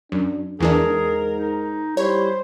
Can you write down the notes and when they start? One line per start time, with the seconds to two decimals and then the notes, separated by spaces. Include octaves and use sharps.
0.12 F#2 D4
0.60 E2 G#2 E3 D4 G#4 A#4
1.33 D#4
1.97 G3 E4 C5 C#5